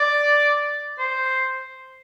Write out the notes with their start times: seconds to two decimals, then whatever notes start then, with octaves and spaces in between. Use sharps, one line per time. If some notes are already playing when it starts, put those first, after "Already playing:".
Already playing: D5
0.99 C5